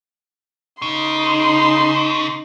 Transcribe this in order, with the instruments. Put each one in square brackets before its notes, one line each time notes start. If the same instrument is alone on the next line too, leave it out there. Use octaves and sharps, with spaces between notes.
[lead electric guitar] C#3 [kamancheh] D#4 C6